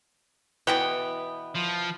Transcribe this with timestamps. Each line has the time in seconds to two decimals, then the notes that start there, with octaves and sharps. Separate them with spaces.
0.67 B2 E3 B3 F#5 G5
1.55 F3